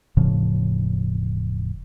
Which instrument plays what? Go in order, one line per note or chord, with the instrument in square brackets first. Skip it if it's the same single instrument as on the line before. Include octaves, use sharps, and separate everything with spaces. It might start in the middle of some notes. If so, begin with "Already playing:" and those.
[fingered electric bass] E1 A2 C#3 F3